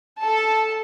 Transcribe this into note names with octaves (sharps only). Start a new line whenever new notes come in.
A4 A5